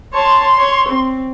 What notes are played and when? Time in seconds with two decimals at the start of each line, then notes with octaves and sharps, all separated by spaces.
0.13 C#5 A5 C6
0.57 C#5
0.88 C4